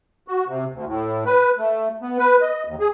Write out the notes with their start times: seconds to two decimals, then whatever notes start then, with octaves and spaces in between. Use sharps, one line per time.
0.28 F#4
0.48 C3
0.72 D2
0.87 A2
1.26 B4
1.58 A3
2.02 B3
2.19 B4
2.41 D#5
2.67 D#2
2.80 G#4